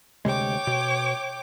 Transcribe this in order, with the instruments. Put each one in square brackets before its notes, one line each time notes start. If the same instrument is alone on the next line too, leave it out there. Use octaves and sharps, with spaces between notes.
[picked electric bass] D2 C3 G#3 [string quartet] C#5 G5 D6
[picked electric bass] B2